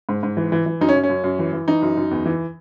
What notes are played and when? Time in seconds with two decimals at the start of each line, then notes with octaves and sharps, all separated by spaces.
0.09 G#2
0.23 G#2
0.37 E3
0.52 E3
0.66 E3
0.81 F#2 D#4
0.89 C#4
0.96 F#2
1.03 C#4
1.10 F#2
1.24 F#2
1.39 E3
1.53 E3
1.68 E3 D#4
1.82 F#2
1.97 F#2
2.11 E2
2.26 E3